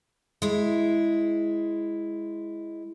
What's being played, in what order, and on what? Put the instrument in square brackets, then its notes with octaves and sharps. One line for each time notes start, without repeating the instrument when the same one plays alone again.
[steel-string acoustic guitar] G#3 E4